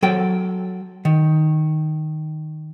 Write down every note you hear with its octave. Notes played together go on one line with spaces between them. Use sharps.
F#3 A4 G5
D#3